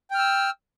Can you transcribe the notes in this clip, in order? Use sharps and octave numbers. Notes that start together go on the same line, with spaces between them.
G5 E6 F6